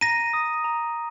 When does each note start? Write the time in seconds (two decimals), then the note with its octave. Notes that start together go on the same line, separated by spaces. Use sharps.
0.01 A#5 A#6 D#7
0.33 D#6
0.64 A#5